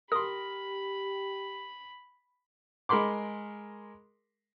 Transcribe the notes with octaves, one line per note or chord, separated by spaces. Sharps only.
G4 A#4 B5 C6 D#6
G#3 A#4 B5 C6 D6